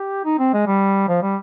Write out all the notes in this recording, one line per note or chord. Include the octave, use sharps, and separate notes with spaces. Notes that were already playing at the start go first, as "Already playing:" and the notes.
Already playing: G4
D#4
C4
G#3
G3
F3
G3